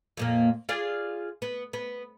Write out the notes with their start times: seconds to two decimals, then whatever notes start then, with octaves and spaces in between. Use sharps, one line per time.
0.17 F2 A#2 A#3
0.69 F4 G#4 D5
1.42 B3
1.73 B3